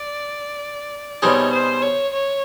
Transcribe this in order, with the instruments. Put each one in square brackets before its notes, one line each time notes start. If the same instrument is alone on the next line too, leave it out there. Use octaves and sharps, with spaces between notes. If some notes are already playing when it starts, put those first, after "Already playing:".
Already playing: [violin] D5
[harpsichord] B2 G3 C4 D#4 G#4 [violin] C#5
[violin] C5
C#5
C#5